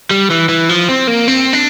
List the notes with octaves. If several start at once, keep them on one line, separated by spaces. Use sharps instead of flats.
G3
E3
E3
F3
C4
A#3
C4
D4